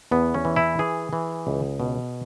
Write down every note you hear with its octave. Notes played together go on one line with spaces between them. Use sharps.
E2 B3
C#4
E3
E4
E3 G#4
E3
C#2
B2